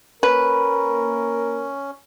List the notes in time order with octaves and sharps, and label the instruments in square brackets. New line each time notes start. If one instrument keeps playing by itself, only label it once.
[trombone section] A#3 A#4 [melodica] C#4 [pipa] B4